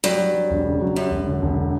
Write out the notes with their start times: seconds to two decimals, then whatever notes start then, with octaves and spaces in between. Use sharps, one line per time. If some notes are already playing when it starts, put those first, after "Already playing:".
0.04 G2 F#3
0.19 F#3
0.34 F#3
0.50 E1
0.65 C#3
0.81 F#3
0.95 F#2 G3
1.11 E1
1.27 D3
1.42 E1
1.56 D3